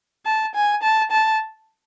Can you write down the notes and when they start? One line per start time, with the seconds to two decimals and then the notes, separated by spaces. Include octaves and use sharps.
0.25 A5
0.55 G#5
0.82 A5
1.11 A5